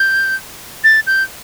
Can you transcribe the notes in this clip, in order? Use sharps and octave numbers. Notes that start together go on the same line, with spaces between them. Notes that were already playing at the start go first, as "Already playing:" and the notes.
Already playing: G6
A6
G6